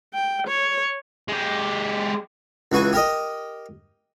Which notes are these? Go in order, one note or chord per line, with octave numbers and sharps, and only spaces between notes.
G5
C#5
G#3 G4
C#2 E3 F#4 G#5
G4 A#4 D#5